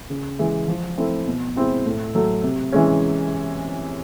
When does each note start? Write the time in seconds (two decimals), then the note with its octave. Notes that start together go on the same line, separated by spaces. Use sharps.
0.10 C#3
0.39 E3 G#3
0.68 F3
0.97 A3 C4 E4
1.27 B2
1.56 G#3 C4 E4
1.86 A2
2.15 F#3 A3
2.43 C3
2.72 E3 G#3 C#4